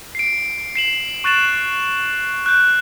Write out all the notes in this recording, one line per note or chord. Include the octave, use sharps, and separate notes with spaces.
C7 D7
C7 E7 F#7
C#6 F#6 A6 D7 E7 F#7
F#6 G6